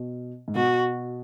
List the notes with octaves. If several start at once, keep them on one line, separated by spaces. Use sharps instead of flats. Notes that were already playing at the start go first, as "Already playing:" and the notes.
Already playing: B2
G#2
B2 F#4